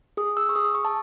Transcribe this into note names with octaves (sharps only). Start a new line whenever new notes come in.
G#4 D#6
E6
C#6
G#4 D#6
C#6
A5